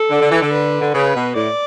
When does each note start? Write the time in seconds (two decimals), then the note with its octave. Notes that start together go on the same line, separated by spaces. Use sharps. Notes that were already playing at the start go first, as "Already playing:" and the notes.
Already playing: A4
0.10 D3
0.21 D3
0.31 E3
0.41 D3
0.52 B4
0.81 D3
0.93 C#3 B4
1.15 B2
1.35 A2 D5